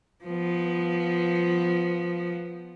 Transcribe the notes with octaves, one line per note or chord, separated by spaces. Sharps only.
F3 B3